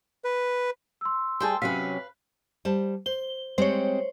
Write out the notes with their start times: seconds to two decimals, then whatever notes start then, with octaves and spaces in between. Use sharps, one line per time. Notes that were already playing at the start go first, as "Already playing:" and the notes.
0.24 B4
1.01 C6 E6
1.40 G3 G#4 C5 G5 A5
1.62 C3 F#3 C#4 B4 F5 B6
2.65 G3 C5 A5
3.06 C5 G7
3.58 G3 G#3 C4 C5 C#5